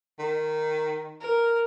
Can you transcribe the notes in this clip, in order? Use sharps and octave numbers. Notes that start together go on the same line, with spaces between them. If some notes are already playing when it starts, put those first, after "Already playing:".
D#3
A#4